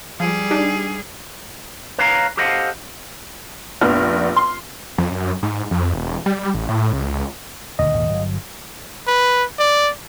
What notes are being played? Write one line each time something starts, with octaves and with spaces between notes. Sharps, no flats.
F3 G3 G#4
D4 D#4 G4
B4 C#5 F5 A5 A#5
G4 A4 C5 D#5 F5 F#5
F1 A#1 B3 D4 F6
C6
F2
F#2
G#2
F2
E1
G3
A1
A2
C#2
D#1 D2 D3 D#5
D#1 G#1 D#2
G1 F#3
B4
D5